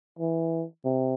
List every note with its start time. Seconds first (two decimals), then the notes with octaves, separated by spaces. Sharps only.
0.19 E3
0.85 C3